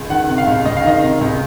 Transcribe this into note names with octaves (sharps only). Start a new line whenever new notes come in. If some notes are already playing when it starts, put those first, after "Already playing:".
Already playing: C#2
D#3 F#5
C3
F5
C#2
C#2 D#5
F5
D#3 D#5
C3
C#2